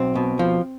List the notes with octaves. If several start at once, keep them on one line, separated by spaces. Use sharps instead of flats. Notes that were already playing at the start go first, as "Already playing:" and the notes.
Already playing: B1 C4
B2
F3